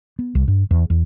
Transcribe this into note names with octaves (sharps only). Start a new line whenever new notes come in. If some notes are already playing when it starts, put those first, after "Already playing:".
B3
C2
G2
E2
E2